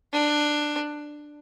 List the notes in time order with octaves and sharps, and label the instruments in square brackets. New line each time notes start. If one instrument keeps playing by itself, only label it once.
[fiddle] D4